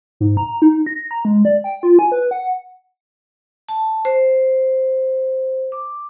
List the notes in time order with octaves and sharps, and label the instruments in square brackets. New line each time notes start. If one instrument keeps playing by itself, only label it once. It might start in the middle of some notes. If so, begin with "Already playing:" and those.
[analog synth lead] G#2
A#5
D#4
A#6
A#5
G#3
D5
G5
F4
G#5
B4
F#5
[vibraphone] A5
C5
D6